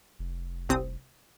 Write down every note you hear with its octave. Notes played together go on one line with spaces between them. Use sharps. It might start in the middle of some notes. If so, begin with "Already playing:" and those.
F1
C2 C4 D#6